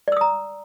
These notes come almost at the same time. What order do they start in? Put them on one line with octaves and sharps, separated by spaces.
D5 E6 D#6 A#5